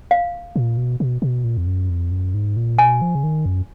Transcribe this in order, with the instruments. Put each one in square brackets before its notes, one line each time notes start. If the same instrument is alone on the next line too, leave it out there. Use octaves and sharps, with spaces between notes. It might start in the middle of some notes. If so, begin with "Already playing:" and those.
[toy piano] F5
[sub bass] A#2
B2
B2
B2
A#2
F2
F#2
F2
F#2
G#2
A#2
[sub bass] B2 [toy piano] G#5
[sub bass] F3
C#3
D#3
F#2